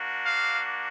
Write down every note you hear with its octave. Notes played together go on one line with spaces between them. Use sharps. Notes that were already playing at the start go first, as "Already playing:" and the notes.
Already playing: A#3 D4 F#4
F5